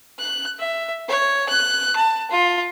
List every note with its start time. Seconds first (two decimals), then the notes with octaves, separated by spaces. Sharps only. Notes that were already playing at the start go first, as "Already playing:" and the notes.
0.19 F#6
0.59 E5
1.09 C#5
1.49 F#6
1.96 A5
2.31 F4